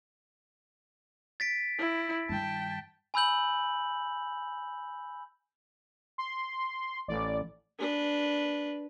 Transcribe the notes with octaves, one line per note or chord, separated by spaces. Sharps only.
A6 B6 D7
E4
G2 D#3 G5 A5
G#5 B5 E6 G6 F#7
C6
A1 D5
D4 B4